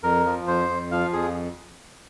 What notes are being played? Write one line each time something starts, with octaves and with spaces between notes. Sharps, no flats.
F2 A#4
F3
F2 C5
F2
F3 F5
F2 G#4